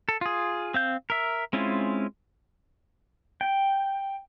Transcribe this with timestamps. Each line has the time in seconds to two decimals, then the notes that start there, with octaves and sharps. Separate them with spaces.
0.09 A4
0.21 F4 G#4
0.74 C4 F5 G6
1.10 A#4 E5
1.53 G#3 C4 C#4 E4 F4
3.41 G5